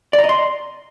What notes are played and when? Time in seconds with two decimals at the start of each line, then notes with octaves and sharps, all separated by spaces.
0.13 D5
0.19 A#5
0.24 D#5
0.29 C6